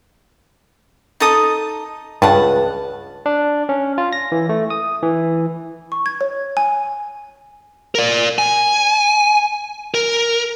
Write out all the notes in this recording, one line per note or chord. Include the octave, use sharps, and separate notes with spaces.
D#4 A4 D#6
C#2 G2 F#5 A5
D4
C#4
F4
A#6
E3
A3
D#6
E3
C#6
G#6
C#5
G#5
A#4 D5
G#5
A#4